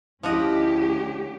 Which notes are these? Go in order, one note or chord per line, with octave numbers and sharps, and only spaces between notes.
D2 F3 C#4 E4 F#4 G4 D#5